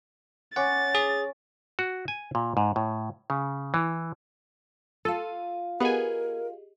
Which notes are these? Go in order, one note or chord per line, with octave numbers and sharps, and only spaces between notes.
C#4 F#5 D6 A6
G#4
F#4
G#5
A#2
G#2
A2
C#3
E3
F4 A4 F5 D#7
B3 G4 G#4 A#4 D#5 G#5